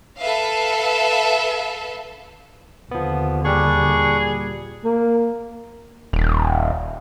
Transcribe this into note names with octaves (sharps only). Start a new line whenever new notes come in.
A4 B4 E5 F5
D#2 D3 F3 B3
A#2 G3 D4 G4 G#4 C#6
A#3
D#1